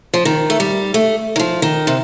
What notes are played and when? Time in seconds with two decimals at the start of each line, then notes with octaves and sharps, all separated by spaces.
0.14 F3
0.25 D#3
0.50 A3
0.60 G3
0.94 A3
1.36 D#3
1.40 F3
1.62 D#3
1.87 C3